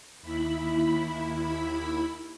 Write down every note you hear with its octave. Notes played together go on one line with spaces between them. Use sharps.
D#2 E4 B5